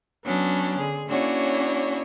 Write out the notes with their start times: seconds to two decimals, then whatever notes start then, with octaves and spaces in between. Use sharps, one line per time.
0.24 F#3 B3 C#4 D4
0.78 D3 G#4
1.08 A#3 C#4 D4 E4 F#4 C#5